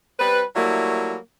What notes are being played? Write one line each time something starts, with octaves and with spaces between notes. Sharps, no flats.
G3 C4 B4
F#3 G3 A3 A#3 E4